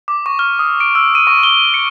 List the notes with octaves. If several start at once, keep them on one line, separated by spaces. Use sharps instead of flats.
D6
C#6
F6
D#6
D7
E6
D#7
C#6
G7
C#7